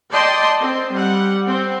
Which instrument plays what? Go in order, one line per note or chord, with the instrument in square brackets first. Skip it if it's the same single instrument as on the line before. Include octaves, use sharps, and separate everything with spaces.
[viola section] D5 D#5 G5 A5 C6
C4
G3 F#5
C4